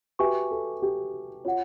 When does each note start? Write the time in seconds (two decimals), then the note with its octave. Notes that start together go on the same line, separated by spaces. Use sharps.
0.19 F#4 G4 B4 E5 G#5 C#6
0.51 A4
0.82 G4
1.45 F4 C#5 F#5